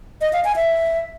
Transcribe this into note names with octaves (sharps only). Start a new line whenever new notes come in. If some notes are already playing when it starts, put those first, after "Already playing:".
D#5
F5
G#5
E5